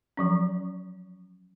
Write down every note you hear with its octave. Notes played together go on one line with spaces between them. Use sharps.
F3 F#3 C#4